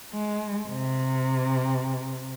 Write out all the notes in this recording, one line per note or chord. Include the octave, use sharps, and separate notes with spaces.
G#3
C3